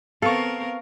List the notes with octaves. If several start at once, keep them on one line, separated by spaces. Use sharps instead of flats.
B3 C4 A4 A#4 F5 C#6